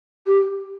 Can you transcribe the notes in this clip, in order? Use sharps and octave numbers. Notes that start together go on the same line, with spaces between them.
G4